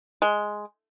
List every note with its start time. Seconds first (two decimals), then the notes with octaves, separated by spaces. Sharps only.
0.22 G#3